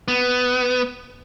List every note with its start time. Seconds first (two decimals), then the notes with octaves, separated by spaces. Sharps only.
0.08 B3